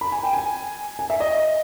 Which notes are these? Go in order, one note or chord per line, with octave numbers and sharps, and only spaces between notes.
B5
G#5
G5
G#5
G#5
E5
D#5